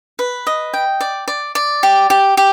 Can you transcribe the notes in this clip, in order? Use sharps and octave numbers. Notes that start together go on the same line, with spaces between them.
B4
D#5
G5
D5
D5
D5
G4
G4
G4